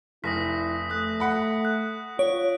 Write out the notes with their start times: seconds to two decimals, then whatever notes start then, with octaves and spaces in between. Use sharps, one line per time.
0.24 F1 E4 D#6 A#6 B6
0.90 A3 D#6 F#6
1.20 F#5 B5
1.65 F#6
2.19 F4 C#5 D7